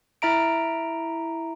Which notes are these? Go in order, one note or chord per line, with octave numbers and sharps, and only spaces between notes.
E4 E5 A#5 D7